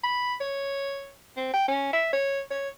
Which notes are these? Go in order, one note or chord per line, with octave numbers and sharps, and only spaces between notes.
B5
C#5
C4
G5
C#4
E5
C#5
C#5